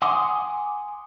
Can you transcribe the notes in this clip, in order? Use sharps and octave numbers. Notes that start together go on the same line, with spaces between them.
F#5 G#5 C6 D6 D#6